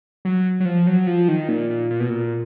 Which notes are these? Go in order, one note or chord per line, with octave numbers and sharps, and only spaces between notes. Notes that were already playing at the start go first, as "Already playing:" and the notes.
F#3
F#3
F3
F#3
F3
D#3
A#2
A#2
A#2
B2
A#2